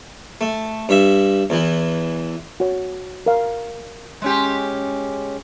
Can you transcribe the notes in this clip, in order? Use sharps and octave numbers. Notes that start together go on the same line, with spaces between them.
A3
G2 E5
E2 E3
F#4 C#5
A#4 F5
G#3 C#4 G4